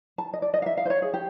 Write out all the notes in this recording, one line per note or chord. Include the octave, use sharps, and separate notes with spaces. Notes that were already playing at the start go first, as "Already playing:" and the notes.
A5
D#5
D5
D#5
F5
E5
F5
C5
C#5
G#4
G4